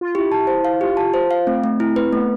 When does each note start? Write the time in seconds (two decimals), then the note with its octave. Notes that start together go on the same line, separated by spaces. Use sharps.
0.01 F4
0.15 E4 G4
0.32 A5
0.47 C5
0.65 F5
0.81 F4 G4
0.97 A5
1.14 C5
1.31 F5
1.47 A3 C4
1.64 A3
1.80 E4
1.96 B4
2.13 A3 B3